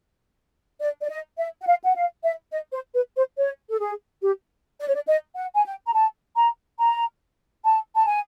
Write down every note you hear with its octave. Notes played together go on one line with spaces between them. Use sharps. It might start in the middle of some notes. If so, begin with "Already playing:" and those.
D5
D5
D#5
E5
F#5
F5
F#5
F5
E5
D#5
C5
B4
C5
C#5
A4
G#4
G4
D5
C#5
D5
D#5
F#5
G#5
G5
A#5
A5
A#5
A#5
A5
A5
G#5